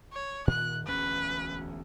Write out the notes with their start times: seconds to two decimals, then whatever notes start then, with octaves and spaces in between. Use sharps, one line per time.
0.13 C#5
0.47 A#2 D#3 F#6
0.87 E1 D2 C#4 B4